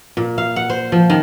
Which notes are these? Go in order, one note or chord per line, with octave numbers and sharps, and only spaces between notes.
A#2
F5
F#5
C5
F3
D#3